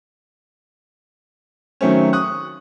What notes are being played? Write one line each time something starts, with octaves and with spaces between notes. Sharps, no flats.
D#3 F#3 A3 C4 C#4
C#6 D#6 F#6